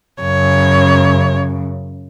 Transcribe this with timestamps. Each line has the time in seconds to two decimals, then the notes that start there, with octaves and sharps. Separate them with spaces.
0.22 F#2 C#3 C#5